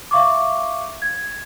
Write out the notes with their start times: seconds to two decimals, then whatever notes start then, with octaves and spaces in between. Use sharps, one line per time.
0.11 E5 F5 C#6 D6
1.02 G#6